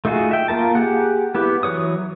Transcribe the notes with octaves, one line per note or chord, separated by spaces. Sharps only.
A3 D#4 F4 F#4 G#4
E5 G5
A#3 F4 A#4 A5
G4 G#4 F#5
B3 E4 G4 B4
E3 F#3 B4 C#5 D#6